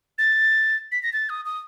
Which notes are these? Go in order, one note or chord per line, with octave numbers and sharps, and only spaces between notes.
A6
B6
A#6
A6
D#6
D#6